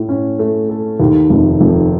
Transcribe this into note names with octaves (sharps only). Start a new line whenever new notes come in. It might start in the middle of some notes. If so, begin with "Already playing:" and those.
Already playing: A2 A3
C#4
A3
A4
D#2
F1
F1